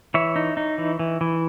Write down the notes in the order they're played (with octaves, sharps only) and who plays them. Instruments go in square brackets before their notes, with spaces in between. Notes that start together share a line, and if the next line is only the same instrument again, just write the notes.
[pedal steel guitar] E3 C#5 E5
D#4
D#4
E3
E3
E3